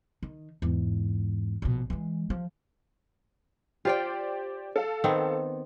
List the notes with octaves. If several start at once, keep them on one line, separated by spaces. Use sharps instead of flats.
D#3
E2 G#2
A#1 B2
E3 G#3
F3
F4 G4 C5 D5 F5 G5
A4 F5
D#3 B3 C4